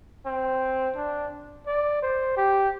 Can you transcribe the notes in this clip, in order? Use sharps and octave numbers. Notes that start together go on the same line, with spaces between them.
C4
D4
D5
C5
G4